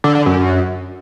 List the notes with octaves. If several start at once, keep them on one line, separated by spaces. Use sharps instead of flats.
D3
D3
F#2